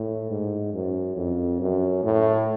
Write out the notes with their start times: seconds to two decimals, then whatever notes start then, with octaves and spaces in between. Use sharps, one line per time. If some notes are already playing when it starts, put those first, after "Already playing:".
Already playing: A2
0.30 G#2
0.73 F#2
1.16 F2
1.60 F#2
2.03 A2